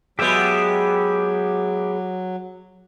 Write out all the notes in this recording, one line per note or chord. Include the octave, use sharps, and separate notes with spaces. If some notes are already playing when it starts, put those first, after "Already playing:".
F#3 G#3 B3 G4 E5 G5